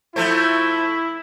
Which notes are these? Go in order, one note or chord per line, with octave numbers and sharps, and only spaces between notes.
F3 A3 E4 C5